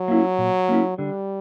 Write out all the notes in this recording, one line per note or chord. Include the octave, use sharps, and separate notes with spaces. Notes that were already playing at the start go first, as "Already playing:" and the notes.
Already playing: F#3
A#3 C#4 E4
A#2
A#3 C#4 E4
D3 G3